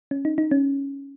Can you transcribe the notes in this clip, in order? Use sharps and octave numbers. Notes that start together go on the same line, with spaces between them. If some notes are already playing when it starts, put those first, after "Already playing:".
C#4
D#4
D#4
C#4